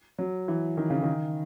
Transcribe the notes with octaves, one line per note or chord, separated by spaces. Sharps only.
F#3
E3
D#3
C#3
D#3